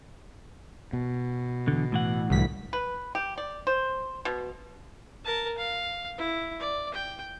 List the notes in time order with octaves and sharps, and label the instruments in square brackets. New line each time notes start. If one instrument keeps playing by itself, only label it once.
[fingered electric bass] B2
[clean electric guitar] E2 D3
A2 E3 F#5
[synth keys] C2 B6 [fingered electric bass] G#2 D3 F#3
[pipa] B4
G4
D5
C5
B2
[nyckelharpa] A#4 A5
F5
E4
D5
G5